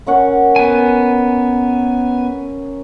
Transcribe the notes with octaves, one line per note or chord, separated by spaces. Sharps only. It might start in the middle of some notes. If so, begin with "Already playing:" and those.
A#3 C#4 F#5
B3 G#5